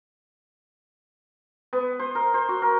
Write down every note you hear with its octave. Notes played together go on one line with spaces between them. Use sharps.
B3
C5
A#4
C5
F#4
A#4